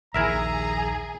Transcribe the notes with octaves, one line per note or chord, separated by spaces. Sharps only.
A#1 D#2 E4 G#4 A#4 E5 A#5